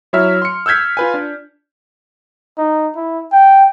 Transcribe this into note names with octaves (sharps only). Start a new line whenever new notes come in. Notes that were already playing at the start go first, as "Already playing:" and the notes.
F#3 E4 C#5 E5 F6
C6 C#7
E6 F6 G6 G#6 B6
F4 B4 G#5
D4
D#4
E4
G5